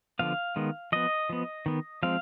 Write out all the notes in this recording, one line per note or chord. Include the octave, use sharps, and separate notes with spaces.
D3 F3 B3 F5
D#3 G#3 B3
F3 B3 D#5
F3 B3
D#3 B3
F3 G#3 C4 F5